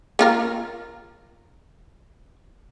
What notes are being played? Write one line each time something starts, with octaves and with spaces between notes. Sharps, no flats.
A#3 F4 A#4